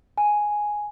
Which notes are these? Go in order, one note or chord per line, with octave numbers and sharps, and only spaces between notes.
G#5